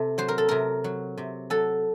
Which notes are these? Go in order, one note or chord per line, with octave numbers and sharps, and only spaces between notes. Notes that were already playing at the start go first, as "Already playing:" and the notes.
Already playing: C3 A4
F#3 C5
A#4
A4
C3 A#4
F#3
C3
F#3 A4